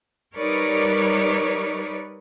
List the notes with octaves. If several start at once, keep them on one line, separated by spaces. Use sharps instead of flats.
G3 D#4 A#4 B4 C#5 D5